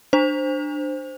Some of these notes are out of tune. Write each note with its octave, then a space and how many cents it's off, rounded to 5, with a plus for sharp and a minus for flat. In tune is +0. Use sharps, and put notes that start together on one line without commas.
D4 +20 C5 +0